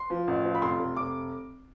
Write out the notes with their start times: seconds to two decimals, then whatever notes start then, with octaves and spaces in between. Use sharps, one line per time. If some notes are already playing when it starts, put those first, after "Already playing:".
Already playing: C6
0.10 F3
0.28 A1
0.45 F3
0.55 B5
0.62 F1 C6
0.79 F1
0.97 F1 D6